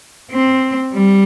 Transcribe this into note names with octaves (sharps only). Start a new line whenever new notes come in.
C4
G3